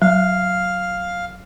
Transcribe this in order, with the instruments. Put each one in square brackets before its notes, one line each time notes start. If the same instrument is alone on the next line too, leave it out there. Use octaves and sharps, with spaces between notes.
[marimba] F#3 [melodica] F5